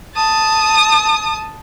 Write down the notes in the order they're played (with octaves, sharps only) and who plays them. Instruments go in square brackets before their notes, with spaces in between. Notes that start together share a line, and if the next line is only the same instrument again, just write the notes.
[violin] A5 D#6